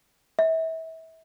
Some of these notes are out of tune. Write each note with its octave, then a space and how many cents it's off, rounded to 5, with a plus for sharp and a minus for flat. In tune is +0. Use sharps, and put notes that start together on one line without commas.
E5 -30